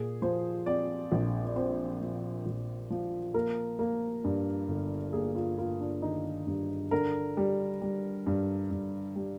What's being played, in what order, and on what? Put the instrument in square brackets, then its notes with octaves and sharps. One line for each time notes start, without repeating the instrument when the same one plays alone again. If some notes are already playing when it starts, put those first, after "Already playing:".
Already playing: [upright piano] A#2 G#4
F3 C5
C4 D5
A#1
D5
C4 C5
F3
A#1
F3
A#3 A#4
A#3
G2
G1
A#3 G#4
F4
A#3 F4
D4
D#3 D#4
G2
D3 A#4
G3
G3
G2
G2
G3